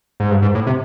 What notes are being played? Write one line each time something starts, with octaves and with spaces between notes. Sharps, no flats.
G#2
G2
G#2
A2
C3